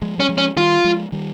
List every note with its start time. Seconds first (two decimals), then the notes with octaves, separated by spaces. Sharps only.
0.02 F3 G#3
0.18 G3 C#4
0.29 F3 G#3
0.38 C#4
0.56 D#3 G3 F4
0.84 F3 G#3
1.12 D#3 G3